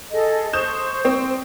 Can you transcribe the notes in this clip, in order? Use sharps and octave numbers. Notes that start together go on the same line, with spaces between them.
G#4 A4 D#5
C5 C#6 D#6 G6 E7
C4